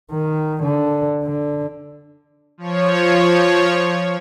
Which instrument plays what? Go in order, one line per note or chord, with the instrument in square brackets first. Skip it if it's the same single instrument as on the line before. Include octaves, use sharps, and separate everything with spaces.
[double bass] D#3
D3
D3
[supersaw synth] F3 C#5